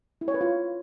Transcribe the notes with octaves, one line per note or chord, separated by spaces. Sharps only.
E4
C#5
B4
F4